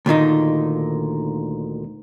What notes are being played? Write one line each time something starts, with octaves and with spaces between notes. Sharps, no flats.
D2 A#2 D#3 D#4